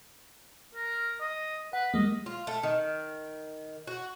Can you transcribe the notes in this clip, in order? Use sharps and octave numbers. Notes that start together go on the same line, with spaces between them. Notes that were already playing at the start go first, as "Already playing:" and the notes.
A#4
D#5
B4 F#5
G3 G#3 A#3 D#5
F4
A3
D#3
F#4